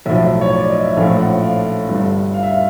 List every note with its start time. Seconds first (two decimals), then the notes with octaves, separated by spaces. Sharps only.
0.06 B1 A2 F3 E5
0.41 C#5
0.55 D5
0.70 D#5
0.83 E5
0.97 A#1 A2 F3 A3 C#4 F5
1.19 F#5
1.43 F5
1.89 G1 G2 D3
2.34 F5
2.43 E5
2.50 F5